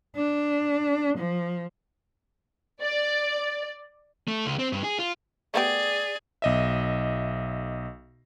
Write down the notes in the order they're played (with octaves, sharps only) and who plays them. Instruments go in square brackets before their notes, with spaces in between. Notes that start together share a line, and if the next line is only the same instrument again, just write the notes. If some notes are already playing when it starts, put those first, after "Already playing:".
[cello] D4
F3
[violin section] D5
[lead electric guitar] A3
C#2
C4
G2
G#4
F4
[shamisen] A3 B3 G4 [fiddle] G#4 [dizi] D5
[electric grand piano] B1 D#5 E5